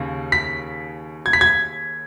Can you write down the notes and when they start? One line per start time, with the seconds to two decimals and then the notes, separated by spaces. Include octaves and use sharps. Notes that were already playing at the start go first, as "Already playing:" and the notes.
Already playing: D#2 C#3
0.32 B6
1.26 G#6
1.33 B6
1.41 G#6